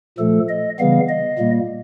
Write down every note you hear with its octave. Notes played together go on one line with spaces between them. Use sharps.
A#2 F3 A3 A4
D#5
C#3 E3 G3 B3 F5
D#5
A#2 G3 A#3